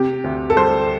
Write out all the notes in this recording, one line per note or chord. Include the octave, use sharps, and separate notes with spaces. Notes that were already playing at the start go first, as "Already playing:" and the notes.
Already playing: C3 G4
D2
A4
G3 C5